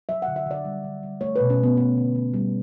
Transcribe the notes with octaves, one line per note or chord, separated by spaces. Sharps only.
F#3 E5
F#5
D3
E5
D3 D5
G3
D3
G3
A3 C#5
B2 B4
C#4
A3
B3
A3 B3
D3
A3
G3